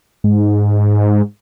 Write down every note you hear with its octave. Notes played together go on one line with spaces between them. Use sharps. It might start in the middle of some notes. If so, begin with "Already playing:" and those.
G#2